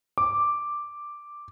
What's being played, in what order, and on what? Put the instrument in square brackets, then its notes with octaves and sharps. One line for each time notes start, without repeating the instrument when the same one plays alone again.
[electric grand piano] D6